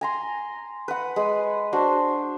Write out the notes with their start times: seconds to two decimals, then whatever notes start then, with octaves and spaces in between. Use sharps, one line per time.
0.01 G#5 A#5 C6
0.88 B4 F#5
1.16 G#3 B4
1.73 D4 F#4 C5